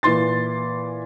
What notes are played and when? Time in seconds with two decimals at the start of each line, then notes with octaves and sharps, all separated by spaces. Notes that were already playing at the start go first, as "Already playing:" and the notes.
0.03 A#2 E3 C6 A6